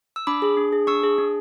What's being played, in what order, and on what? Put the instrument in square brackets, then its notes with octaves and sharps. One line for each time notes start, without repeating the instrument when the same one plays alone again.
[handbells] E6
D4 B5 D6
G#4
D4
G#4
D4 C#6 E6
G#4
D4